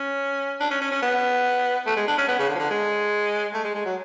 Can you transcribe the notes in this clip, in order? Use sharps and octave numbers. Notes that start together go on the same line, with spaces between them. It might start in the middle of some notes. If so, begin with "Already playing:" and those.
Already playing: C#4
D4
C#4
C#4
C#4
B3
A3
G#3
D4
C#4
B3
C#3
D3
F3
D3
G#3
A3
G#3
G#3
F#3